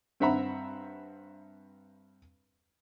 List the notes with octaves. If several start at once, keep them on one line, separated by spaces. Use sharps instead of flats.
G2 C4 E5 F#5 A#5 B5